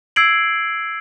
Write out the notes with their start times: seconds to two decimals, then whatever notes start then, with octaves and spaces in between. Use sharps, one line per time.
0.16 E6 G#6 C7 D7 F#7